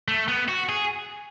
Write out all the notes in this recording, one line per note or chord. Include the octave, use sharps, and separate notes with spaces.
A3
B3
F#4
G#4